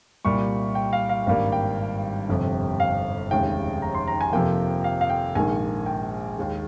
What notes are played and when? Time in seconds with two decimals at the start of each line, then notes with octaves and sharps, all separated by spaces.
0.25 C2 A#2 G3 A#3 C#6
0.75 G5
0.93 F5
1.09 F5
1.26 G#1 G2 G3 A#3 F5
1.52 G5
2.29 G1 F2 C3
2.80 F5
3.31 F1 D#2 C#3 G#3 G5
3.82 A#5
3.95 C6
4.07 A#5
4.21 G#5
4.33 F2 C3 F3 A#3 G5
4.84 F5
5.01 F5
5.10 G5
5.35 A#1 G#2 D#3 A#3 G#5
5.86 G5
6.37 D#2 D#3 G#3